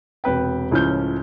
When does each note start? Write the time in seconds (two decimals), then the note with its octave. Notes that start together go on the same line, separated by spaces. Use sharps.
0.24 E1 C3 B4 G5
0.71 C#2 A2 F3 C#4 F6 G6